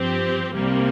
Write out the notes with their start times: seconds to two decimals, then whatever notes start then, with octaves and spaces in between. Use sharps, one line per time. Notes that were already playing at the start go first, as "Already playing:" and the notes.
Already playing: G2 F3 C4 G4
0.54 C2 C3 G3 A#3